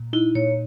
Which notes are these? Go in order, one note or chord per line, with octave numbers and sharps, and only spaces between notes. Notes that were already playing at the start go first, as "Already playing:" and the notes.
Already playing: A#2
D#4 E4
A#2 C#5